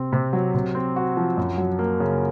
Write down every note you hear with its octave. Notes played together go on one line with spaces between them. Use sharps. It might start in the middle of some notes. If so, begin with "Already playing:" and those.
Already playing: C3 C4
C3
F#3
C3
C4
F#4
F3
F#2
F#3
A#3
C#3